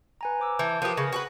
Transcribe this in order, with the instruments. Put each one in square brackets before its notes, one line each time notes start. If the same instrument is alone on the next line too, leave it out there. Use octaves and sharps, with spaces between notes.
[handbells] B4 G#5 A#5
C5 D6 E6
[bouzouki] E3 [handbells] A5 G6
[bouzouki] F3 G4 [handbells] A#4 B4 D#6
[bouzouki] C#3 [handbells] A#6
[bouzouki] F#4 G#4 B4